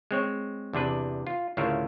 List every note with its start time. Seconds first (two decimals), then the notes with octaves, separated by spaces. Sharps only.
0.11 G#3 C4 C#5
0.73 E2 C3 D4 B4
1.27 F4
1.57 D2 A2 C#3 F4 A#4 E5